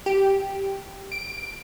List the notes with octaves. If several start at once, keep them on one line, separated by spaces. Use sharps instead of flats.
G4
D7